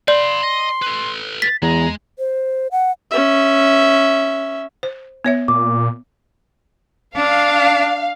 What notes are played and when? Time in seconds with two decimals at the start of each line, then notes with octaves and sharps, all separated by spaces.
0.08 D5 F5 B5 C6
0.43 D#5
0.82 A4 B4
1.42 A6 B6
1.62 E2 G#3 A#5
2.19 C5
2.72 F#5
3.11 C#4 E5
4.83 C5
5.25 B3 C#5 E5
5.48 A#2 D6
7.16 D4 F5